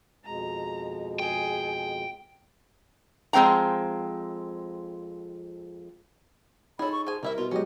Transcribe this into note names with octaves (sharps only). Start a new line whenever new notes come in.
F2 B2 G#3 A#5
G#4 G5
F2 G#3 C4 G5 A#5
D#4 G#4 A4 C#5 B5
C#6
F3 G#4 G#5
C2 A#3 E4 A#4 E5
B2 F4
F#3 G#3 C#4 G4 D#5